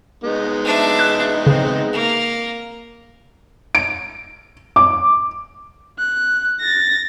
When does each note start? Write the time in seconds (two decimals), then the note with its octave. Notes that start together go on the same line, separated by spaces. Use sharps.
0.24 G#3 B3 D#4
0.65 D4 E5
0.99 F#6
1.47 C#3 C4
1.93 A#3
3.75 D7
4.76 D6
5.99 F#6
6.61 A6 A#6